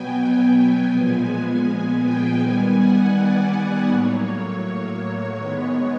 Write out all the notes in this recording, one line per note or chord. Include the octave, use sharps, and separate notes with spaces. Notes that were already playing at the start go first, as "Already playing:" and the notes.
Already playing: B2 F#3 B3 G5 G#5
G#5
G5
A#2 F3 G#3 B3 G#5
G5
D#3 G3 B3 G#5
F#5
D5
D5
A2 F#3 A#3 C#5
C#5
C#5
C#5
D#3 G#3 B3